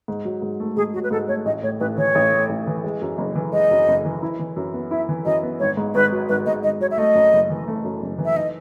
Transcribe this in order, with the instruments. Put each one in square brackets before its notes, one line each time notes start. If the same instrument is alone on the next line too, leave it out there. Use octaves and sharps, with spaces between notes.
[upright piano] G#2
F#3
G#2
A3
[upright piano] G#2 [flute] G#4
[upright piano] F#3 [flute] F#4
[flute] B4
[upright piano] G#2 [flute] A4
[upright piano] A3 [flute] C#5
[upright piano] A1 [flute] D#5
[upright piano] A2 [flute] C#5
[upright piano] A1 [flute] B4
[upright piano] E3 [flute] C#5
[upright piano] A1
A2
A1
E3
G#3
F#2
F#1
E3
[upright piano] G#3 [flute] D#5
[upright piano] F#2
F#1
E3
E4
E3
F#2
B3
[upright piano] E4 [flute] E5
[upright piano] E3
[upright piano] F#2 [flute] D#5
[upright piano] B3
[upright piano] G#1 [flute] C#5
[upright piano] G#2
[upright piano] G#1 [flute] B4
[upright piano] F#3
[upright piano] G#1 [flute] B4
[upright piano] G#2 [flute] D#5
[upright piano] G#1 [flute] D#5
[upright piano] F#3 [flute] C#5
[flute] E5
[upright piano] A3 [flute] D#5
[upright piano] F#2
F#1
E3
A3
F#2
F#1
E3
[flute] E5
[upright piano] D#4 [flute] D#5